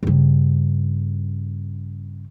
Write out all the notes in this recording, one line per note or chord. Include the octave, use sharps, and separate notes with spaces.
G2 C#3